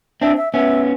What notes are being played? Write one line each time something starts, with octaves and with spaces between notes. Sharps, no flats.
C4 D4 E5
E5
B3 C#4 E5